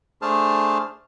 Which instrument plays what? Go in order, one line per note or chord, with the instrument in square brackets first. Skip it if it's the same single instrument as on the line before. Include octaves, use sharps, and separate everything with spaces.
[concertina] A3 D4 G#4 C5 A5 F6